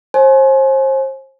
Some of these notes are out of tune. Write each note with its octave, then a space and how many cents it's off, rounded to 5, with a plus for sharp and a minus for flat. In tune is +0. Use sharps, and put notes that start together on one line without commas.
C5 +35 G#5 +30